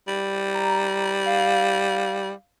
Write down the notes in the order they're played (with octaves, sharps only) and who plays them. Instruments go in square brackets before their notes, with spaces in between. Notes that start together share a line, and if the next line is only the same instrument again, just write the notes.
[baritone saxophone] G3
[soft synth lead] A#5
F5